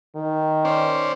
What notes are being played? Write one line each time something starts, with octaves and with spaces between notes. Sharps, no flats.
D#3
C#4 C5 D5